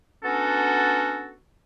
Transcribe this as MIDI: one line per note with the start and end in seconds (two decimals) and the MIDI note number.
0.24 1.34 59
0.24 1.34 61
0.24 1.34 62
0.24 1.34 66
0.24 1.34 69